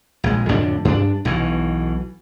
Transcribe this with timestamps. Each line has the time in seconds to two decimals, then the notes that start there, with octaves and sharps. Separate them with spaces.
0.24 A#1 G#3
0.49 F2 A2 D3 D4
0.85 G2 D4
1.25 B1 B2 E3